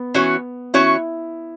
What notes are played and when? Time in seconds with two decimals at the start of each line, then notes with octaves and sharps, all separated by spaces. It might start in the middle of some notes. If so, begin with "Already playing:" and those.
Already playing: B3
0.14 E3 C#4 F#4 C#5
0.74 E3 C#4 E4 F#4 C#5